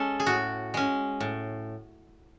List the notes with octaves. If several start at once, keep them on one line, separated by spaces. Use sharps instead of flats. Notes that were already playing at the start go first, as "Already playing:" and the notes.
Already playing: G#3 C#4 A4
G#4
A2 F#4
G#3 C#4
A2